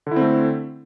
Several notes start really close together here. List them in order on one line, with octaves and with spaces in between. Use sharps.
D3 E4 C4 A3